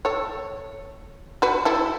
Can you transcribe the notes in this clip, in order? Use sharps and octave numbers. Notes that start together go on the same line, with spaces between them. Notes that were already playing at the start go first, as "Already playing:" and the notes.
A4 C#5
F#4 B4
E4 A4